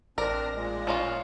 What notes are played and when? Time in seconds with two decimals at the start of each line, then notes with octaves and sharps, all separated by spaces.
0.18 A1 C4 D4 A#4 D5 A#6
0.54 A#2 G#3
0.87 F3 C#4 F4